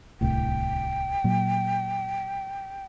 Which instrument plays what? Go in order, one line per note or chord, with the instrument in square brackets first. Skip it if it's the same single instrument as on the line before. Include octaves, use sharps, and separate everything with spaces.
[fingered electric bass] D1 C2 A2 [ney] G5
[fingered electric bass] A#2 F#3